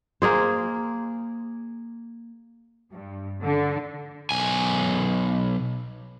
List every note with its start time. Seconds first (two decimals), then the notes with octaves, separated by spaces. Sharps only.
0.22 A#3 G#4 C5
2.92 G2
3.44 D3
4.31 B1 G#5